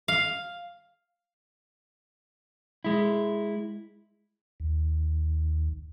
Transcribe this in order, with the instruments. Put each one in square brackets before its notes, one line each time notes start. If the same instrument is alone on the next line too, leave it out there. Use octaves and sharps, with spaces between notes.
[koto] F5
[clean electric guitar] G#3 E4
[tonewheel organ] D#2